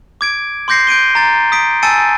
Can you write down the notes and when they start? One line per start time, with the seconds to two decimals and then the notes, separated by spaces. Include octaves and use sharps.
0.21 D6 G#6 D7
0.68 C6 D6 G6 A#6 C7 C#7
0.87 G6 D7 D#7 G7
1.15 A#5 A6
1.52 D#6 B6 D7
1.83 G#5 A5 E6 A6 C#7 D#7